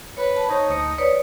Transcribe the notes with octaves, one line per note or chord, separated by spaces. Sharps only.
B4 C#5
A5
D#4 C5 C#5
D2 D#6 C#7
B4 C#5 D5 D#6